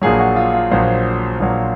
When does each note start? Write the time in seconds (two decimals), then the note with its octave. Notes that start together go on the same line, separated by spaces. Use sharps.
0.02 A#1 A#2 F#3 G#4
0.20 F#4
0.36 F4
0.54 F4
0.71 A#1 A#2 F#3 C5
1.40 A#1 A#2 F#3